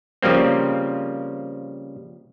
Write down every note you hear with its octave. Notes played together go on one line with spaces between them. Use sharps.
C#3 F3 G3 A#3 C4